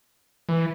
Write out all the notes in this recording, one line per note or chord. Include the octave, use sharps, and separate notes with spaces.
E3